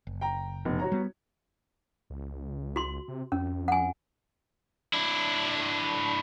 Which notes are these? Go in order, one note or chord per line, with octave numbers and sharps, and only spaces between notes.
F#1
G5 A#5
F1 B2
F#4 C#5 A#5
G3 B3
C#2
F#4 C6
C3
F2 C#4
F#5 G#5
D4 E4